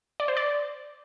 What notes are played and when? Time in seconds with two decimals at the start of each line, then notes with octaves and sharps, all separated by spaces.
0.20 D5
0.28 C5
0.37 D5